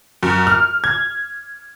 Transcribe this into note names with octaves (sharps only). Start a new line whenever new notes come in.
F#2
F6
G#6